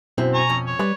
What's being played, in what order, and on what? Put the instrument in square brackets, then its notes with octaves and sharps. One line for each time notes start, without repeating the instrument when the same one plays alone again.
[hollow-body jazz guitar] F#2 C4 E4 [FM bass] B2
[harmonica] G#5 A#5 C#6
[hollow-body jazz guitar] F2 C#4
[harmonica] C#5
[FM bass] G3 [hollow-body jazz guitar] B4 D5